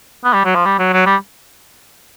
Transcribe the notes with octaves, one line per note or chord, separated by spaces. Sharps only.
B3
G3
F#3
F3
G3
F#3
F#3
G3